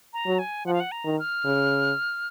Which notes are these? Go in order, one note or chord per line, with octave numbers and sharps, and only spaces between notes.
A#5
F#3
G#5
F3 F#5
F5
F#5
A#5
D#3
F6
C#3